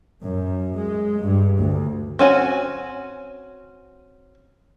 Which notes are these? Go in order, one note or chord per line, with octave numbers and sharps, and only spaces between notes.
F#2
G#3
G2
D2
C4 C#4 F#4 G#5